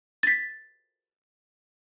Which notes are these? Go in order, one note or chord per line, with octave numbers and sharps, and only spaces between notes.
A6 B6